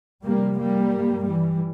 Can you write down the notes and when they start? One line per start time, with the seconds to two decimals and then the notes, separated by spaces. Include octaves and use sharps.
0.25 F2 C3 G3 A#3
0.59 G3 A#3
0.92 G2
1.25 E3 G3